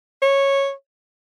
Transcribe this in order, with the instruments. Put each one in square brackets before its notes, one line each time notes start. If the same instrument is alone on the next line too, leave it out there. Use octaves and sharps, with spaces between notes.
[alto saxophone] C#5